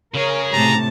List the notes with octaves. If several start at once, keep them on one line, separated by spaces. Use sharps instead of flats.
C#3 G#4 A#4 C#5
A2 C3 A5 A#5